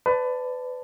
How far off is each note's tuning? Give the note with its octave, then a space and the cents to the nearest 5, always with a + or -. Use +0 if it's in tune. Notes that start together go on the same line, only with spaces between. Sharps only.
B4 +30 D5 +0 A5 +5